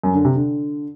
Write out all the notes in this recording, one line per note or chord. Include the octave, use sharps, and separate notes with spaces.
F#2
D3
C3
D3